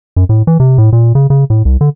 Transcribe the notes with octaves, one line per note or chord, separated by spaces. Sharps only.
F#2
A2
E3
C3
A2
A#2
C#3
C#3
A2
C2
D3